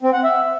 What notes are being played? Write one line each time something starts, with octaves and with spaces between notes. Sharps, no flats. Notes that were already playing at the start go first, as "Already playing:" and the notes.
C4
F#5
E5